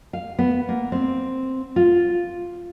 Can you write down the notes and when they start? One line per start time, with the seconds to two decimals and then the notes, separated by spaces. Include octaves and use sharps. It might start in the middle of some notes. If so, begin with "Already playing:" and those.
0.13 F5
0.39 B3
0.69 A#3
0.92 C4
1.76 F4